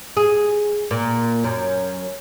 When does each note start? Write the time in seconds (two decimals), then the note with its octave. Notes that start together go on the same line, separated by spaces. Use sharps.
0.17 G#4
0.91 A#2
1.44 F#2